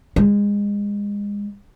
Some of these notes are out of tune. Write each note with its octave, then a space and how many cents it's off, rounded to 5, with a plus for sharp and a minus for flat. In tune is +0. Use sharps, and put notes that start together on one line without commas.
G#3 -30